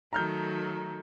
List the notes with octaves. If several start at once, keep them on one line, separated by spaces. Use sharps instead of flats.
D#3 F#3 A3 A#5 F6 G6